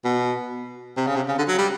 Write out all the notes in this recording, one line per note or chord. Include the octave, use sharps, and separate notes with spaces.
B2
C3
C#3
C3
C#3
D3
F#3
G3